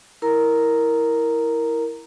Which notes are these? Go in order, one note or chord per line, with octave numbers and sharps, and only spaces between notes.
E4 A#4 A#5